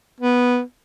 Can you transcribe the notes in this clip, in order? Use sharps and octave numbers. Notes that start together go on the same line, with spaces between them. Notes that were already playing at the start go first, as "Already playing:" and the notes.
B3